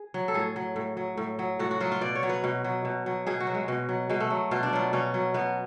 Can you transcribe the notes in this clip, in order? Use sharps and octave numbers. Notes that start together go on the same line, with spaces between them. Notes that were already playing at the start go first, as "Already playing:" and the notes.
Already playing: G#4
F#3
A4
A2 G#4
F#3
A2
F#3
A2
F#3
A2 F#4
F#4
F#3 F4
F4
B2 D5
C#5
F#3
B4
B2
F#3
B2
F#3
B2 G#4
F#4
F#3
G#3
B2
F#3
B2 G#3
A3
F#3
B2 F4
D4
F#3 F4
B2 C#4
F#3
B2 B3